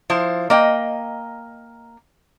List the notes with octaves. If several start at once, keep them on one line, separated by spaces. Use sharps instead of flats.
F3 E4 C5
A#3 D#5 G5